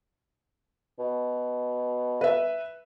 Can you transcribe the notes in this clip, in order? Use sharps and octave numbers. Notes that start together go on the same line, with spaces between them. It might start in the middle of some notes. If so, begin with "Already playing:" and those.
B2
B4 E5